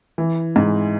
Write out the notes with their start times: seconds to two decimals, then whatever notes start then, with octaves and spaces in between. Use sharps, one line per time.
0.18 E3
0.56 G#2